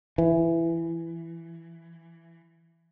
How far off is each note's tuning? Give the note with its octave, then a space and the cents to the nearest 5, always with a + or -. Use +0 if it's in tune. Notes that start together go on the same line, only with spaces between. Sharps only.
E3 +15